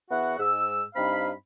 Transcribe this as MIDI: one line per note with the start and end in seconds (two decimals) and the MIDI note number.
0.10 0.38 40
0.10 0.38 59
0.10 0.38 64
0.10 0.38 66
0.10 0.38 78
0.39 0.83 44
0.39 0.83 88
0.95 1.30 43
0.95 1.30 60
0.95 1.30 63
0.95 1.30 77
0.95 1.30 83